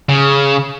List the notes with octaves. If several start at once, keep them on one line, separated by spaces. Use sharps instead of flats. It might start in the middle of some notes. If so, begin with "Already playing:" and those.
C#3